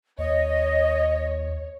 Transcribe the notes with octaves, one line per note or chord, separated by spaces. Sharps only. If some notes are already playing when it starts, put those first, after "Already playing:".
D#2 C#5 D#5